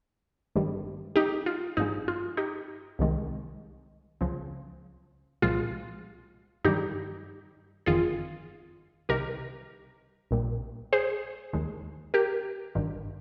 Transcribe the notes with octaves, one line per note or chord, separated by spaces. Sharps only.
G#1 G2 D#3 G3
D#4 G4
F4
G#1 G2 F3 G#3 D#4
F4
D#4 G4
C2 C3 D#3 G#3
C#2 C#3 F3
C2 A#2 F3 G#3 F4
G2 D#3 G3 D#4 G4
G1 F2 D#3 F4 G#4
C2 C3 D#3 G4 A#4
A#1 A#2 G3
G#4 C5
D#2 D#3 G#3
G4 A#4
G#1 G2 D#3